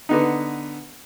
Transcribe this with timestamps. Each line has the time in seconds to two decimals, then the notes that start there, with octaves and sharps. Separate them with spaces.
0.09 D3 B3 D#4